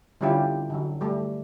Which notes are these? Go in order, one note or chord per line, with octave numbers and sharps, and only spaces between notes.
D3 G3 C#4 E4 F4 G4
D3 F#3
G3 A3